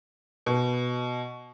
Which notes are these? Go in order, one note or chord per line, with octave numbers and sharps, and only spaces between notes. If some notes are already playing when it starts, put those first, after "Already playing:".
B2